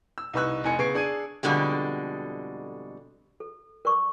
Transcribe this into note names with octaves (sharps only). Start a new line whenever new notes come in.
E6
C2 D#4 B4 C#6 E6 F#6
F1 D#4 G#5 C#7
C#3 B3 C#6 G#6 C7 D7
D4 G#4 G#6 D#7
F2 B2 D3 G3 G#3
A4
A#4 D5 C#6 D6